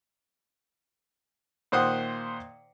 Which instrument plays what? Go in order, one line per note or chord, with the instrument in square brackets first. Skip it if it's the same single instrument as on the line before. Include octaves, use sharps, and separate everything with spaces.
[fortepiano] A#2 D#3 C5 F#5 D#6